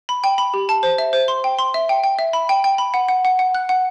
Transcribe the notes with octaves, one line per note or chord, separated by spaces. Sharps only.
B5
G5
B5
G4
A5
C5
E5
C5
C6
G5
C6
E5
G5
G5
E5
B5
G5
G5
B5
F#5
F#5
F#5
F#5
F#6
F#5